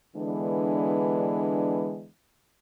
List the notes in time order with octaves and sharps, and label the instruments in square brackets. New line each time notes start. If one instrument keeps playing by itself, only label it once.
[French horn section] D3 E3 G#3 B3 D4